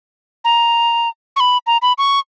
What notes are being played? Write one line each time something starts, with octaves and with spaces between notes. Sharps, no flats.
A#5
C#6
B5
A#5
B5
C#6